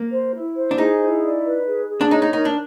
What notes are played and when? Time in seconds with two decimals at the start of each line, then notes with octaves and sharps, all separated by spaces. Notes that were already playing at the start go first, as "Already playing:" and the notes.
Already playing: A#3
0.11 C5
0.34 E4
0.56 C5
0.71 D4
0.78 D#4 G#4
1.01 E4
1.23 D5
1.44 B4
1.67 G#4
1.89 G#4
2.01 D4
2.11 D#4 C#5
2.22 D#4
2.33 D#4 A#4
2.45 D4